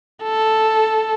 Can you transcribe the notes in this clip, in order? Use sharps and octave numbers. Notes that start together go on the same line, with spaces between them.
A4